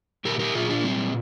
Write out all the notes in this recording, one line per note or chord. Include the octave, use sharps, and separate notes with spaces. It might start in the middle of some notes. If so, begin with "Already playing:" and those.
A#2 G4 A#4
G4 A#4
A#2 F4 G#4
D4 F4
G3 C4